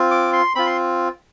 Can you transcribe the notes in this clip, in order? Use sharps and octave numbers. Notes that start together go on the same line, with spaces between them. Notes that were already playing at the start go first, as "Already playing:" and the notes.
Already playing: C4 F4
D6
C6
C4 F4 B5
C6